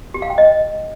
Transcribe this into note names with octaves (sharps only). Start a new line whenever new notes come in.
G4
F5
G5
D#5